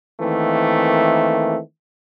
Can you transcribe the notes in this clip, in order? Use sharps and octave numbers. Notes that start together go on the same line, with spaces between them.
D#3 E3 A3 A#3 C4